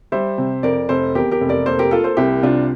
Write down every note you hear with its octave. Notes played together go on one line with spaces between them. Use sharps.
G3 C5 E5
C3
F2 A#4 D5
F1 A4 C5
E2 G4 A#4
G4 A#4
F1
A#4 D5
A#3 A4 C5
G4 A#4
A#3 F4 A4
A4 C5
C2 E4 G4
C3 D4 F4